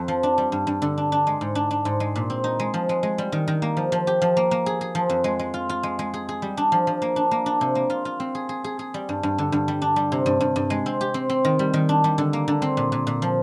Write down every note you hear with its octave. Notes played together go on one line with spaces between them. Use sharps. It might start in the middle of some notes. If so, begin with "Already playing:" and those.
Already playing: F2
F3
D4
G3
G2
G2
D3
D4
D4
G#3
G#2
D4
D4
G#2
G#3
A#2
C4
D#4
G#3
F3
G#3
G#3
G3
D#3
D#3
A#3
F3
F3
G4
F3
A#3
A#3
G#4
G#4
F3
F2
G#3
G#3
F4
F4
G#3
G#3
G#4
G#4
G3
D4
F3
F3
A#3
D4
A#3
D4
C3
A#3
F4
F4
C4
G#4
G#4
G#4
G#4
G3
G2
G2
D3
G2
G3
D4
G3
C3
G2
G2
G2
G#3
C4
G4
C4
C4
D#3
G3
D#3
D4
G3
D3
A#3
D3
C4
A#2
A#2
A#2
F3